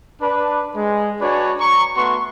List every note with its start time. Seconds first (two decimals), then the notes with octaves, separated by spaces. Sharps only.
0.21 D4 B4
0.75 G#3
1.21 D4 F#4 B4 C#5 D5 G#5
1.60 A#5 C#6
1.96 A3 B3 F#4 C6 C#6